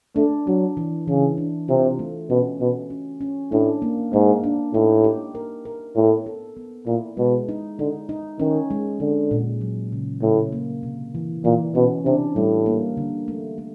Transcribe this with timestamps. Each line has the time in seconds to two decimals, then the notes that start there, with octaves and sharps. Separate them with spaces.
0.16 A3 D4
0.47 F#3 D4
0.77 E3
1.08 C#3 E3
1.38 D4
1.68 C3 F4
1.99 A3
2.30 B2 C#4
2.60 B2 F#4
2.90 C#4
3.21 C#4
3.52 A2 D4
3.82 A#3
4.13 G#2 A#3
4.44 D4
4.73 A2 D#4
5.04 G4
5.35 A#4
5.65 A#4
5.95 A2 B3
6.26 A4
6.57 B3
6.87 A#2 E4
7.17 B2 G#3
7.49 D#4
7.79 D3 D#4
8.09 D#4
8.40 D#3 C#4
8.70 G#3
9.00 D3 G#3
9.31 A#2
9.61 F#3
9.92 C#3
10.22 A2 C#3
10.52 A#3
10.83 C3
11.15 E3
11.45 A#2 E3
11.75 B2 C#4
12.05 C3 D4
12.36 A2 G3
12.66 A#3
12.97 D3
13.28 A3
13.58 A3